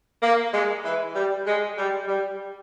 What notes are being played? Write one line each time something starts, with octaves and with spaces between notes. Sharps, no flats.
A#3
G#3
E3
G3
G#3
G3
G3